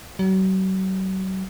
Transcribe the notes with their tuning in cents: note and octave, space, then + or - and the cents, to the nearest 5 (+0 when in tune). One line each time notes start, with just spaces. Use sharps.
F#3 +40